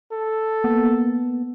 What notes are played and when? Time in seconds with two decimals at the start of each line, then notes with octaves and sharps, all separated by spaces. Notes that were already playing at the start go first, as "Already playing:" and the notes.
0.12 A4
0.64 A#3 B3